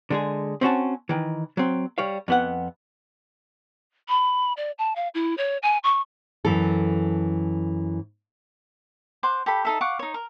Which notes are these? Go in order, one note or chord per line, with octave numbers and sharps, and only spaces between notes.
D3 G#3 G#4
C4 C#4 F#4 A5
D#3 E3
F#3 C4
G3 C#5 F5
F2 B3 F#5
B5
D5
A5
F5
E4
C#5
G#5
C#6
F#2 E3 A4
C5 F#5 D6
G4 A4 B5
D#4 A4 E5
F5 F#5 C#6 D6
D#4 C#5
A#4